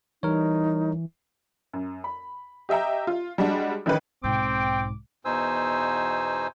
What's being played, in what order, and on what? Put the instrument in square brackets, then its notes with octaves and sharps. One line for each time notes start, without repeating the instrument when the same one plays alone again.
[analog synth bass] E3 [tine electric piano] G3 A#4 C#5 [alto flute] D#4
[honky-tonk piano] F#2
B5
G4 D#5 E5 G5 A#5
F4
G3 G#3 D4 F#4
A1 D#3 C#4 B4
[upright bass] B1 G#2 [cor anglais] C4 [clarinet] G5 [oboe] D6
[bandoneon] E2 B2 D#4 C5 G#5 E6